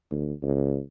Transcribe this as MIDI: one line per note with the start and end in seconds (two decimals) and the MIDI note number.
0.11 0.33 38
0.43 0.79 37